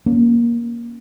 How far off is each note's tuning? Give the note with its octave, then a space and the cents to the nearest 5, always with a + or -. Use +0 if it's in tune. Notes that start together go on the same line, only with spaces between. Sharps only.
A#3 +15 C#4 +0